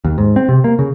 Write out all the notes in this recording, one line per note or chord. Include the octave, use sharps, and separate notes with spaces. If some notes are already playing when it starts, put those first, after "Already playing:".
D#2
G#2
C4
C3
A#3
C#3